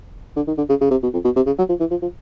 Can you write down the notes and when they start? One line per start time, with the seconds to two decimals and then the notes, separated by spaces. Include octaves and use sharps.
0.36 D3
0.47 D#3
0.58 D3
0.69 C#3
0.81 C#3
0.91 C3
1.03 B2
1.14 F2
1.25 B2
1.36 C3
1.46 C#3
1.58 F#3
1.69 F3
1.80 E3
1.91 F3
2.02 F3